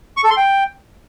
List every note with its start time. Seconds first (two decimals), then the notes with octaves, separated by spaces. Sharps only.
0.17 C#6
0.24 A4
0.30 C6
0.37 G5